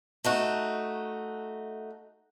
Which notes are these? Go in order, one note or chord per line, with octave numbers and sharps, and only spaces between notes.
A3 D#4 F#4